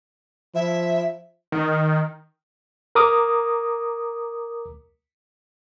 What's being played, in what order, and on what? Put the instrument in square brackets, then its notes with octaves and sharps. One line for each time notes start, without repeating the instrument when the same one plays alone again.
[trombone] F3 [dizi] E5
[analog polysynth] D#3
[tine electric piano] A#4 A#5 D6 D#6